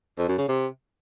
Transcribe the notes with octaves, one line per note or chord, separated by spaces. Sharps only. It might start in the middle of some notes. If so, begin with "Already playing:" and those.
F2
F#2
C#3
C3